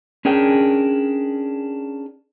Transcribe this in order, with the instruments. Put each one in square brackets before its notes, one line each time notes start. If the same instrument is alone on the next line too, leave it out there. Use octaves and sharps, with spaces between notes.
[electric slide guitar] C#4 D4 G#4 A#4 G5